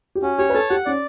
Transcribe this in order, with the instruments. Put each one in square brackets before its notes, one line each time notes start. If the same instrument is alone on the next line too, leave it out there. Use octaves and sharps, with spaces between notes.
[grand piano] G4
[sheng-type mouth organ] C#4 [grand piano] F#4
[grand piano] G4 [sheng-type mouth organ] C#5
[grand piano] B4
[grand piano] A4 [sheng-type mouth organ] A5
[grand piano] G4 [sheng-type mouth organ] F#5
[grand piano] C#4 [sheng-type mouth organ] D5